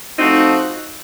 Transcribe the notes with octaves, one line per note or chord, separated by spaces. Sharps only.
F3 A3 C4 D#4 F#4